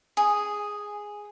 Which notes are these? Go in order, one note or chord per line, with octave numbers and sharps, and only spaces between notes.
G#4